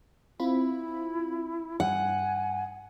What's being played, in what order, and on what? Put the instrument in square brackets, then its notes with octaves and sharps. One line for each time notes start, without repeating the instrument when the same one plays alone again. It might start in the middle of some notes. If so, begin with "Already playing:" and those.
[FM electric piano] C4 F4 B5 [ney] E4
[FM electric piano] G2 [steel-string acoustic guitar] F#5 [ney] G#5